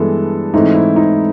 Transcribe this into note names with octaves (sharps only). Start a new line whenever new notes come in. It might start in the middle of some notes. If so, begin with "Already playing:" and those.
Already playing: G2 E3 G#3 B3 A4
G#2 E3 A3 C4 D#4
E4
D#4